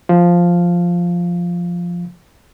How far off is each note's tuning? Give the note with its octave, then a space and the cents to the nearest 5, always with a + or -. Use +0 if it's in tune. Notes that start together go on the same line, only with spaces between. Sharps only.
F3 +0 F5 +0